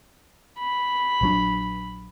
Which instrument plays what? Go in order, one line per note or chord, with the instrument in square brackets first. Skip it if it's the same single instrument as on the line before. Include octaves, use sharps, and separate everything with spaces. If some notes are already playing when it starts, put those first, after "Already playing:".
[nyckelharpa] B5
[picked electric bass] A#1 F#3 D4